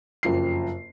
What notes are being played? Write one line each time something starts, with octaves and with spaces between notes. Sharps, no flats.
F#1 F2 C7